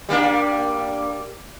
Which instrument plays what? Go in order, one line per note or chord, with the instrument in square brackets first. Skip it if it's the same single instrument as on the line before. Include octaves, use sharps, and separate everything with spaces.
[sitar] G3 A#3 D4